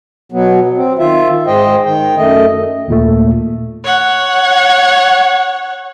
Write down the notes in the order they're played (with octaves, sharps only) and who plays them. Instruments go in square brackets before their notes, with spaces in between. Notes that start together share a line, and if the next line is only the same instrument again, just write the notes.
[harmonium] B2 F#3 B3
C4
D#3 F4 E5
G#2 G#3 C5 D#5 G5
D#3 G5
F#2 A3 D#5
[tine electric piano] D#2 A#2 A3
[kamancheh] C#5 F#5